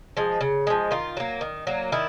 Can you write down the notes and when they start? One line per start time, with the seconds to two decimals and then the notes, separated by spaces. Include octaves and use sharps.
0.17 F3 G#3
0.41 C#3
0.67 F3 G#3
0.91 D#3 F4
1.17 F#3 A#3
1.41 D#3
1.67 F#3 A#3
1.92 D#3 E4